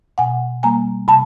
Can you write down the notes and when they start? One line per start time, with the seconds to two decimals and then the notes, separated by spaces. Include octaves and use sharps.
0.18 B2 F#5 G#5
0.63 G3 A#3 G#5 A#5
1.08 C3 A5 B5